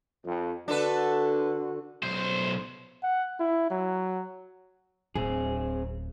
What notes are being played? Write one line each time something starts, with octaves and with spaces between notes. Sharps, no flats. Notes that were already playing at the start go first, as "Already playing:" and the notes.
F2
D3 D4 F#4 A4 B4
B1 C5
F#5
E4
F#3
D1 C4 G#4